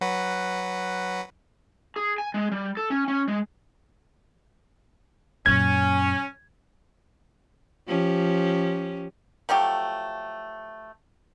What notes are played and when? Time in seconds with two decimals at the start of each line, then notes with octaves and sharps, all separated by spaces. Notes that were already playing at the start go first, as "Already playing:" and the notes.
0.01 F#3 F#4 B4
1.96 G#4
2.18 G#5
2.34 G#3
2.52 G3
2.77 A4
2.90 C#4
3.08 C#4
3.28 G#3
5.46 F#2 A#2 C#4 G#6
7.88 F3 C#4 G4
9.49 F3 F#3 A3 G4